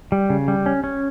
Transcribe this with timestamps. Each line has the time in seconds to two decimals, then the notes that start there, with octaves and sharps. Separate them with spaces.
0.12 G3
0.30 C#3
0.48 G3
0.66 C#4
0.84 C#4